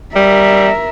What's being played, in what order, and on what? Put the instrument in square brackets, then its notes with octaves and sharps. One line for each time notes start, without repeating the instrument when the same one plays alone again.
[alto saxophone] G3 [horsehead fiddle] A#4 E5